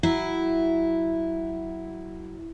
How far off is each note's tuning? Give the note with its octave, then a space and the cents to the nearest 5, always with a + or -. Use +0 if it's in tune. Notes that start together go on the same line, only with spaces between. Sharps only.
F#3 +20 E4 +0